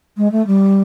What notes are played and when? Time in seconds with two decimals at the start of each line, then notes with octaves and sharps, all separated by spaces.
0.17 G#3
0.32 A3
0.47 G3